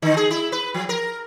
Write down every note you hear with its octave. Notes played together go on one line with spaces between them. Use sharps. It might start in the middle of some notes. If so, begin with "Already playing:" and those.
D3
G#4
E4
B4
F3
A#4